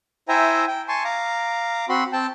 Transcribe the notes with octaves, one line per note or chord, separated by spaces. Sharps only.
E4 C5 E5 G5 G#5 A#5
G5
G#5 A5 C6 C#6
F5 A#5 D6
C4 F#4 B5 C6
C4 G5 A5